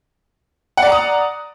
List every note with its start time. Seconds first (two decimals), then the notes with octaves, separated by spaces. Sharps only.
0.77 F#5
0.82 D5
0.87 A#5
0.92 D#6